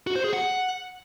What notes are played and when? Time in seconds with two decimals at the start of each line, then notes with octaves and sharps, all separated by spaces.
0.07 F#4
0.16 C5
0.24 G#4
0.33 F#5